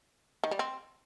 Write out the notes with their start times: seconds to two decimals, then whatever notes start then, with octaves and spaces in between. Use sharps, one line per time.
0.44 D#3
0.51 G3
0.59 C4